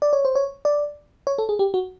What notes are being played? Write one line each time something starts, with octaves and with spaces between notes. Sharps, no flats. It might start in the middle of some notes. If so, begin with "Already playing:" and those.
D5
C#5
C5
C#5
D5
C#5
A4
G#4
G4
F#4